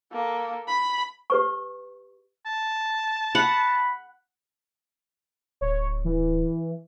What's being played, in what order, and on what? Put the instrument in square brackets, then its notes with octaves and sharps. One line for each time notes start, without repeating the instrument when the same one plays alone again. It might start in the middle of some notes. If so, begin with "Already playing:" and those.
[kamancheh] A#3 A4
B5
[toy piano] G4 B4 C#6
[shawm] A5
[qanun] F#5 [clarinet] B5
[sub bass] D1 [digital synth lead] C#5
[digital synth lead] E3